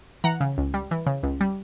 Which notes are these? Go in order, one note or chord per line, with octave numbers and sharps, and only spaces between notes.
E3 F#5 A#5
C#3
C#2
G3
E3
C#3
C#2
G3